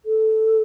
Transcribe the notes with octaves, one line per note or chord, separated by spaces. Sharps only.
A4